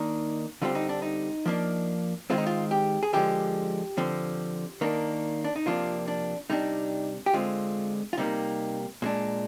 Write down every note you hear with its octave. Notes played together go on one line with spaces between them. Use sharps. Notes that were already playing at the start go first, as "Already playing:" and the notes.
Already playing: D#3 A#3 D4 D#4
D3 G3 C4 F4
D#4
D4
D#4
F3 A#3 D4
D#3 G#3 C4 F4
D#4
F4
G4
G#4
D3 F3 G#3 G4
D3 F3 C4
D#3 A#3 D4
D4
D#4
C3 F3 A#3 D4 F4
D4
C3 G3 D4 D#4
G4
D3 G#3 C4 F4
F4
C3 G3 A#3 D#4
A#2 G#3 D4